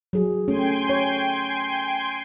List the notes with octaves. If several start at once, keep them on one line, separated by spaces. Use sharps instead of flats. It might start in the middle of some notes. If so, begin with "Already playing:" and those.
F#3 G#4
A3 C#4 G5 G#5 C6
C#5